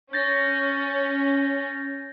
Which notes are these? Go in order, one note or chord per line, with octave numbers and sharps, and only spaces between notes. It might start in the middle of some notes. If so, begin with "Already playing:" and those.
C#4 G6 A6 A#6